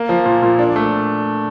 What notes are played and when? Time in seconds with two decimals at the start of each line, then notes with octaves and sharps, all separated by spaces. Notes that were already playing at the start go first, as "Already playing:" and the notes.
Already playing: A#3
0.09 F3
0.25 A#2
0.42 A#2
0.59 D4
0.76 A3